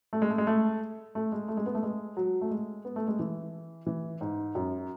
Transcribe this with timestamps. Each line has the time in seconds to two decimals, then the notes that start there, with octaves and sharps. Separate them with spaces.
0.13 A3
0.22 G#3
0.30 A3
0.38 G#3
0.47 A3
1.15 A3
1.32 G#3
1.48 A3
1.57 G#3
1.66 B3
1.75 A3
1.83 G#3
2.17 F#3
2.41 A3
2.51 G#3
2.85 B3
2.96 A3
3.08 G#3
3.19 E3
3.86 E3
4.21 G#2
4.55 F#2